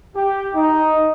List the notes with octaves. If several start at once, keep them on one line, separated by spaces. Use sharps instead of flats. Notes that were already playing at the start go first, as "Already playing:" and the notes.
G4
D#4